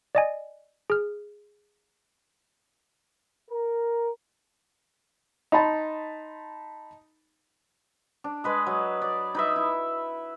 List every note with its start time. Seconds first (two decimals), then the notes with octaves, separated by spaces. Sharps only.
0.15 D5 D#5 G#5
0.90 G#4 F6
3.50 A#4
5.52 D#4 A5 B5 C6
8.24 D4
8.44 G#3 B4 D#5
8.67 F#3
9.02 D5
9.35 D#4 B4 E5
9.56 E4